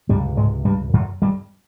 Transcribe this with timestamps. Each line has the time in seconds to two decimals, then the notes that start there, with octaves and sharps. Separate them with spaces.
0.09 C#2 G2 G3
0.13 C3
0.37 G#2 G#3
0.65 G2 G3
0.93 F#2 F#3
1.22 G2 G3